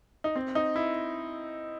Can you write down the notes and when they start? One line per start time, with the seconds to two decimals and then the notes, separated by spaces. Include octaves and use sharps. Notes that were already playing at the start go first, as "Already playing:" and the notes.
0.24 D#4
0.36 C4
0.55 D#4
0.76 E4